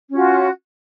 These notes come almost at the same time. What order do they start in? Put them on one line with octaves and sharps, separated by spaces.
C#4 F4 F#4